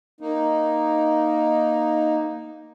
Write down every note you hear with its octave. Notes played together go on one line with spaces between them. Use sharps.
A#3 D#4